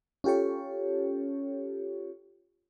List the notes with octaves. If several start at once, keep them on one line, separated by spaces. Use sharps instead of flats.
C#4 F4 G4 A4 C#5